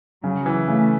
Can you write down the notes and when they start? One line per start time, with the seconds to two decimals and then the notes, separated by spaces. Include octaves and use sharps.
0.23 C#3 F#3
0.46 E3
0.68 C#3 A3